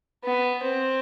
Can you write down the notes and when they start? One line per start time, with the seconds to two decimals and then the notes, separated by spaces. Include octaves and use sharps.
0.24 B3
0.63 C4